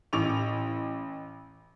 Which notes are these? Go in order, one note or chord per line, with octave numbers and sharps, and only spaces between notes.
A1 C#6 D6 F7